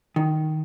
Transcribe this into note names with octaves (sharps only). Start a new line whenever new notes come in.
D#3